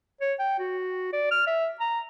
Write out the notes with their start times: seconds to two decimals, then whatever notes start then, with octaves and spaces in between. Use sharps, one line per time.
0.21 C#5
0.39 G5
0.59 F#4
1.13 D5
1.31 F6
1.47 E5
1.80 A#5